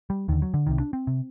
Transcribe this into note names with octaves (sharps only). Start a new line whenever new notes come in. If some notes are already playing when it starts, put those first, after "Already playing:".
G3
D#2 D3 D#3
F#3
D3
C2 C3 D#3
D4
C4
C3